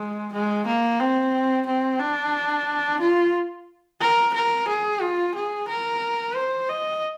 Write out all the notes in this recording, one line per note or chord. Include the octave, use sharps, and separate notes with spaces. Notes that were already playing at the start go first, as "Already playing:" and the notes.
Already playing: G#3
G#3
A#3
C4
C4
D4
F4
A#4
A#4
G#4
F4
G#4
A#4
C5
D#5